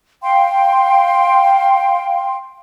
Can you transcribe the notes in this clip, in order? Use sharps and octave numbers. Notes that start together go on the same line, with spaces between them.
F5 G5 C6